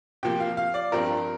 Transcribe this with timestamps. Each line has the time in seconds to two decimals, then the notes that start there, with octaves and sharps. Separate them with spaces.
0.23 C3 F3 A#3 G5
0.40 F5
0.57 F5
0.74 D5
0.92 G2 F3 C4 A#4